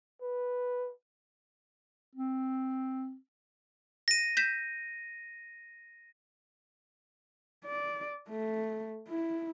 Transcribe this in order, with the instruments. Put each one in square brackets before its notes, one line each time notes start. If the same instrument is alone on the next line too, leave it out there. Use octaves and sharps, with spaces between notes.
[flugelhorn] B4
[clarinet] C4
[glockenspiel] A#6 D#7
[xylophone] G6 B6 E7
[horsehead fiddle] D5
A3
E4